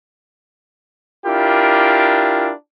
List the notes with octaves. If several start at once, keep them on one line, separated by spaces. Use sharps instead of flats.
D4 E4 F4 G4 A#4